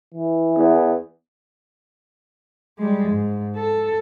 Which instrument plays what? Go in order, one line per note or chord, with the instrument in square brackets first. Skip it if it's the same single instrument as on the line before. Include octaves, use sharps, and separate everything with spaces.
[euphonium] E3
[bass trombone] E2
[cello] G3 G#3
G#2
A4